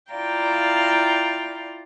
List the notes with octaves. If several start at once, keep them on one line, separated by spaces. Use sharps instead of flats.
E4 F4 D5 F5 G5 A#5